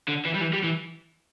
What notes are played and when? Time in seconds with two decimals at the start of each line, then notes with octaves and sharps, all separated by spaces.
0.09 D3
0.26 E3
0.35 G3
0.41 E3
0.53 G3
0.64 E3